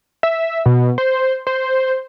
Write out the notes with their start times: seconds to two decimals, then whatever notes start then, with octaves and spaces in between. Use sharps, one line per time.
0.23 E5
0.66 B2
0.98 C5
1.47 C5